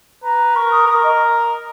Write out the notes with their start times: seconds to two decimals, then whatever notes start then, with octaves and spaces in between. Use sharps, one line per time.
0.23 B4 A#5
0.56 A#4 C#6
0.71 D#6
0.87 A#4 D#6
0.96 C#6
1.03 D#5